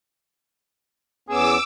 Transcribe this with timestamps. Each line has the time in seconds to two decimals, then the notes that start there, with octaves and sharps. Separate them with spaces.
1.29 E2 B3 C#4 G#4 D6 E6